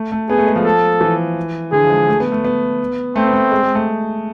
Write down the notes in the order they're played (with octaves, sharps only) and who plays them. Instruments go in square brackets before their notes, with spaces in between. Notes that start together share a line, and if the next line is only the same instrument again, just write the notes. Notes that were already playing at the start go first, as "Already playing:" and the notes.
Already playing: [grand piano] A3
A3
[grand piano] B3 [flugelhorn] G#4
[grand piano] A3
G#3
F3
[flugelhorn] A4
[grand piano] E3
[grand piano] D3 [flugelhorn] G#4
[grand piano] F3
G#3
A3
B3
A3
B3
[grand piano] A3 [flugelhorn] C4
[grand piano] B3
A3
G#3
G#3
A3